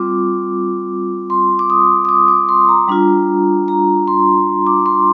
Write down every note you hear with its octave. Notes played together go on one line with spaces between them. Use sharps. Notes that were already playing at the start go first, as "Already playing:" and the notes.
Already playing: G3 C4 F4 D6
C6
D6
D#6
D#6
D6
D6
C6
A#5
G3 D4 F4
A#5
C6
D6
C6